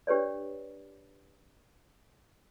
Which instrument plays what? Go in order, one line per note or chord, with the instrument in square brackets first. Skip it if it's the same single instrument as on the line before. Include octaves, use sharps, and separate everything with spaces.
[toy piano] D4 G4 B4 C#5 D5